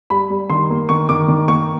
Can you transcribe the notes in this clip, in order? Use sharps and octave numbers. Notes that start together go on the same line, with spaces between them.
G3 B5
G3
D#3 C6
A#3
D#3 C#6
D#3 D6
D#3
A#3 C#6